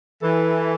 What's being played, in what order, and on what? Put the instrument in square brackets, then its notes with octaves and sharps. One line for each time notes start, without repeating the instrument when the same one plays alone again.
[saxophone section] E3 [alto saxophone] A4